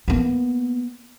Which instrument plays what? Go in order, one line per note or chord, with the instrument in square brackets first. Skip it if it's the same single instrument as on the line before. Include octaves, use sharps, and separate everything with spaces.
[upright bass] A#3 B3